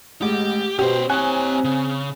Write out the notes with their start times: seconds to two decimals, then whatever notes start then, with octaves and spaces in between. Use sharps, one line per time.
0.22 A1 G#3 G4
0.79 B2 C#4 G4 C5
1.10 C4 G4 C#5 G#5 F#6
1.64 C#3